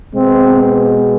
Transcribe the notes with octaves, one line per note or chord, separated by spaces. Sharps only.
B2 G#3 B3 C4